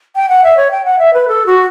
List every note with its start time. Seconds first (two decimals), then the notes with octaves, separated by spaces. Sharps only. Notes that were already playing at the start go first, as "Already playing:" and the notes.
0.15 G5
0.29 F#5
0.43 E5
0.57 C#5
0.71 G5
0.84 F#5
0.99 E5
1.13 B4
1.28 A4
1.46 F#4